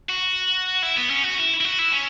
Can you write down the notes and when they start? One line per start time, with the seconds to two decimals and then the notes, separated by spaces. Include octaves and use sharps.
0.09 F#4
0.82 E4
0.96 B3
1.10 C#4
1.23 F#4
1.38 E4
1.61 E4
1.65 F#4
1.79 E4
1.92 C#4